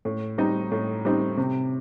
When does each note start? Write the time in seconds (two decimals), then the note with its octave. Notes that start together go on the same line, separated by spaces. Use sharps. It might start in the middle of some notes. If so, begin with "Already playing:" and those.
0.05 A2
0.38 G3 C4 D#4
0.72 A2
1.05 G3 C4 D#4
1.37 C3